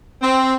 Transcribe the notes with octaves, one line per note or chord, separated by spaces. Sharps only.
C4